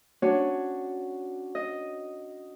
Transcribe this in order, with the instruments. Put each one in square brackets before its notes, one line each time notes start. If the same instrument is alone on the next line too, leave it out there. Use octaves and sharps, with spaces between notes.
[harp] C#4 D4 F#4 C#5
D#5